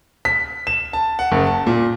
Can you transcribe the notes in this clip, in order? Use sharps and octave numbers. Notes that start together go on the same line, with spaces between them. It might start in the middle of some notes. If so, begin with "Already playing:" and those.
B6
E7
A5
F#5
F#1
A5
A#2